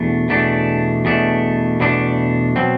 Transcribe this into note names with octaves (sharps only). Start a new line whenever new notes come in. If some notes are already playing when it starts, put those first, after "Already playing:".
Already playing: E2 B2 A3 D4
E2 B2 A3 D4
E2 B2 A3 D4
E2 B2 A3 D4
B2 F#3 C4